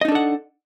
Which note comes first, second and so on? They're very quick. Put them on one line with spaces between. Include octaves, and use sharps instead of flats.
D#5 D#4 D4 A4 F#5